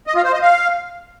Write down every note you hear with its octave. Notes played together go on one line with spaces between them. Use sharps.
D#5
F4
C5
D#5
F5